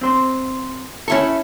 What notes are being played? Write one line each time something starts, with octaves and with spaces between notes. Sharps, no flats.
C4 C5
C#4 E4 A4 E5 C#6